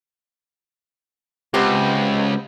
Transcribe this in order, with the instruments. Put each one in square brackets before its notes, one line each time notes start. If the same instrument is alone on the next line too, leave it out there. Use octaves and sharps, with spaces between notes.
[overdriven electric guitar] C#2 [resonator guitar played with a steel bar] B3 C4 G4